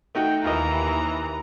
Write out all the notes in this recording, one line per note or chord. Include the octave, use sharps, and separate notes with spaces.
A3 D#4 F#4 G5
D#2 E3 F4 A#4 D#5 A#5